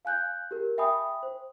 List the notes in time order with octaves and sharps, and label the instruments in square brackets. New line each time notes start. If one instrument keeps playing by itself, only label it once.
[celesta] F5 G#5 F#6 G6
G4 A#4
E5 G5 G#5 B5 D#6
C5